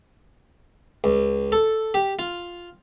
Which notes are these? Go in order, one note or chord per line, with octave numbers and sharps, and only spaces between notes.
C#2
A4
G4
F4